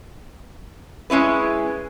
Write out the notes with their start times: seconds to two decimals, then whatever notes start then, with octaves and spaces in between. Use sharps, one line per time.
1.10 G#3 C#4 E4 B4